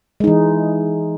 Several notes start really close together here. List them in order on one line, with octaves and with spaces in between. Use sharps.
G#3 D#4 E3